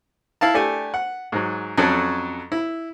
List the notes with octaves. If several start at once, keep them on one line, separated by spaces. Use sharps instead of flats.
E4 F5 A5
A3 D4 G4 A4 G#5
F#5
G#2 F#3
F2 F#3 C#4 A4
E4